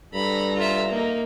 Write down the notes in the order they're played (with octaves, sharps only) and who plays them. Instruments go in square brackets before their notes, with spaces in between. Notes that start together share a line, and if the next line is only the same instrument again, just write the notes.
[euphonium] G2 [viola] A4 A#5 [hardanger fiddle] B5
[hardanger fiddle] F4 E5
A#3 D#4